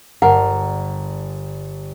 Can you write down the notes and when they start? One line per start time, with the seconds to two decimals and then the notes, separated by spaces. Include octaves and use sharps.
0.22 G1 G2 A#4 F#5